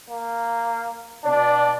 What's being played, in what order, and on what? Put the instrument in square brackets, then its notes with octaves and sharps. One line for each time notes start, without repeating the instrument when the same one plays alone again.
[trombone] A#3
[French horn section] B2 D5 [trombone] D4